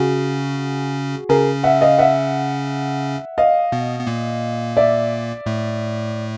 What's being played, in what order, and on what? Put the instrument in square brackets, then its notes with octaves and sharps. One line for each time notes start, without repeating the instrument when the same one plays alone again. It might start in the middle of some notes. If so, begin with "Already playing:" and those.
Already playing: [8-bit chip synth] C#3 C#4 [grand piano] F#4 G#4
[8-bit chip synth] C#3 C#4 [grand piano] G#4 A#4
[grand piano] E5 F#5
D#5 F5
E5 F#5
D#5 F5
[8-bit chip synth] B2 B3
B3
A#2 A#3
[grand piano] D5 E5
[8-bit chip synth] A2 A3